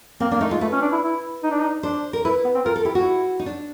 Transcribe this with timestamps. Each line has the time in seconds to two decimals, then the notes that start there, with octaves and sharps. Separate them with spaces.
0.20 A#3 C4
0.31 A#3 D4
0.41 A3 D#4
0.51 G#3 F4
0.61 A3 B4
0.72 C#4
0.82 D4
0.92 E4
1.03 E4
1.43 D#4
1.51 D4
1.60 D#4
1.83 D4 C5
2.13 A#4
2.25 E4 B4
2.45 B3
2.55 C4
2.65 F4 A#4
2.76 A4
2.85 E4 G4
2.95 E4 F#4
3.39 D#4
3.46 D4